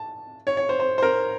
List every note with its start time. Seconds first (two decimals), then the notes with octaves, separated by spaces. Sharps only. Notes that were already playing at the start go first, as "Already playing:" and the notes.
Already playing: A5
0.47 C#5
0.57 C#5
0.69 C5
0.80 C5
0.98 C5
1.03 A#4